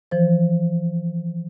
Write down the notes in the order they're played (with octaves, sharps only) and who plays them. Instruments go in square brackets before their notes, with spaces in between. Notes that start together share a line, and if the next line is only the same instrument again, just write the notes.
[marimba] E3 F3 C5